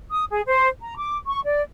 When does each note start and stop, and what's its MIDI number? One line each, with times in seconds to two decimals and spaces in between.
0.10 0.25 87
0.29 0.41 68
0.47 0.68 72
0.81 0.96 82
0.97 1.15 86
1.27 1.40 85
1.45 1.61 74